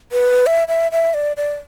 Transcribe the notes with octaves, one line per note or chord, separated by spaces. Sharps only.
B4
E5
E5
E5
D5
D5